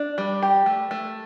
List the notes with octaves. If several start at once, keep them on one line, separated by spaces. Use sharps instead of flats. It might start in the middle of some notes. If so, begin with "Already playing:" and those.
Already playing: D4
G3
G4
A3
A3